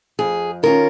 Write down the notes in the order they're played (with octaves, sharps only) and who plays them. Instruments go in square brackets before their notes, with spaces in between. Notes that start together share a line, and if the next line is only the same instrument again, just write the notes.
[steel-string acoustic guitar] F2 G#4
D#3 C#4 F4 A#4